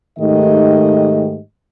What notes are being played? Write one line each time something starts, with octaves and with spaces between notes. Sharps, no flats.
G#2 D#3 A3 G4 D#5